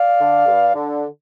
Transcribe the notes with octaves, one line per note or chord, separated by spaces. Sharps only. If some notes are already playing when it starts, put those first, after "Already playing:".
Already playing: D5 F5
D3
G2
D3